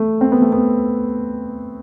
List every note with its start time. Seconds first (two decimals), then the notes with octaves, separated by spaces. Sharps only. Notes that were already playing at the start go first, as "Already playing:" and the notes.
Already playing: A3
0.21 C4
0.32 B3
0.42 A3
0.52 B3